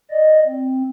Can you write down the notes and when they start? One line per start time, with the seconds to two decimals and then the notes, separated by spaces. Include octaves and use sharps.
0.11 D5 D#5
0.46 C4